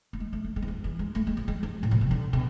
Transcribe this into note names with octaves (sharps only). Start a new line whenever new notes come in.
A3
G#3
A3
A3
G#3
E3
F3
E3
G#3
A3
G#3
F3
G#3
F3
A2
B2
C3
D3
B2